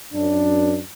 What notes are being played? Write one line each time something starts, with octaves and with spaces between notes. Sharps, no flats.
F#2 D4